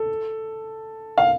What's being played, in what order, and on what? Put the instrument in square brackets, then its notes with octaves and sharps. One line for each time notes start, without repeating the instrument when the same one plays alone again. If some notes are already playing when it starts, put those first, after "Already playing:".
Already playing: [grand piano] A4
F5